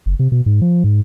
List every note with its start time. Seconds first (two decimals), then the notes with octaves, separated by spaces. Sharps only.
0.06 F#1
0.19 C3
0.32 B2
0.46 G#2
0.61 F3
0.84 G#2